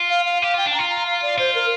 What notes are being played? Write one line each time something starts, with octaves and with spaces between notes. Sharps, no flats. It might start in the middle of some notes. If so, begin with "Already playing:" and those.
Already playing: F4
F5
F5
G4 F5
F4 G5
D4 G5
F4 A#5
A#5
F5
D5
F4 C5
A#4